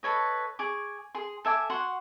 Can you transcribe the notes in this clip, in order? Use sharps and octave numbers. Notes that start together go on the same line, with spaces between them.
A4 B4 C#5 D#5
G#4 C#6 D6
G#4 C6
A4 E5 G#5 D6
F#4 F#5 C6